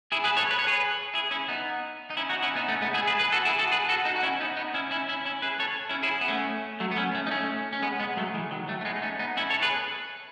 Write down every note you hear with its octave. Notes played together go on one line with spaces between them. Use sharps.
E4 G#4
G#4 B4
A4 C#5
B4
C#5
G#4 B4
E4 G#4
C#4 E4
B3 D#4
D#4
C#4 E4
D#4 F#4
C#4 E4
B3 D#4
A3 C#4
G#3 B3
E4 G#4
G#4 B4
G#4 B4
F#4 A4
E4 G#4
F#4 A4
G#4 B4
F#4 A4
D#4 F#4
F#4
C#4 E4
B3 D#4
B3 D#4
C#4 E4
C#4 E4
C#4 E4
C#4 E4
G#4 B4
A4 C#5
C#4 E4
E4 G#4
B3
A3 C#4
F#3 A3
B3
A3 C#4
A3 C#4
D#4
A3 C#4
C#4
G#3 B3
G#3 B3
F#3 A3
E3 G#3
D#3 F#3
F#3 A3
A3
G#3 B3
D#4
A3 C#4
B3 D#4
C#4 E4
A4 C#5
G#4 B4